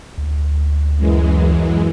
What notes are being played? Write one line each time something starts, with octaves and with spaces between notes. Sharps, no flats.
D2
F#2 E3 G#3